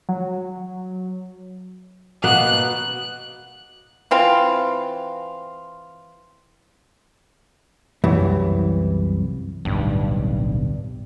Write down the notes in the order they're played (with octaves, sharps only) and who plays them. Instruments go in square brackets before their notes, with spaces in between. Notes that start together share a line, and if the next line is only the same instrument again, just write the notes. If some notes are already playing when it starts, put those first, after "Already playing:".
[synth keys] F#3
[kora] B2 A#3 B3 [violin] F#6
[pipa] E3 C4 F4
[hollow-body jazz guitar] C2 F#2 E3
[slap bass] D1 B1 [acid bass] G2